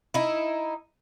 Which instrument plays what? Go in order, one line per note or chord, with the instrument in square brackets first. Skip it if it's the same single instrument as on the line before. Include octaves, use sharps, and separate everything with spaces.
[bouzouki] D#4 E4